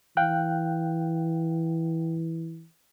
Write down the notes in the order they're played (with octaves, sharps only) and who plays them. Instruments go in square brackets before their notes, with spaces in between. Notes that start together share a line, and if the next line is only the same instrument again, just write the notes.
[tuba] E3 [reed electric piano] F5 G5 F#6